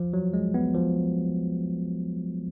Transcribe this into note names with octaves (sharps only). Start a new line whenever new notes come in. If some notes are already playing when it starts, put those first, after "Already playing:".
Already playing: F3
F#3
G#3
B3
F3